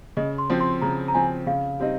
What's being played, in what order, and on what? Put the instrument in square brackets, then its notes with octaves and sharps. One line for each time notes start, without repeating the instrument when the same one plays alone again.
[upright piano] C#3 [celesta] D#5
[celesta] C6
[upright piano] F3 C4
[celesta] C6
[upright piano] C#3 [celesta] A#5
[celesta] A#5
[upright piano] F3 C4 [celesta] G#5
[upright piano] C#3 [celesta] F5
[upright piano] G3 C4 D#4